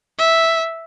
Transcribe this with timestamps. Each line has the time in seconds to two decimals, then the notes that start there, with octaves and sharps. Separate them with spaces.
0.18 E5